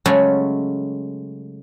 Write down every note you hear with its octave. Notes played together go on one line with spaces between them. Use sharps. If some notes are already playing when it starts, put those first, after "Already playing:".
C#3 F#3 G#3 A3 C#4